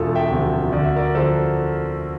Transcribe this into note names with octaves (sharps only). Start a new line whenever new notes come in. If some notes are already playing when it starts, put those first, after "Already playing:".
Already playing: E1 F4 A4
E5 G5
D2 C3 F3
D2 D5
E5
A#4 D5
D3 F3 A4 C5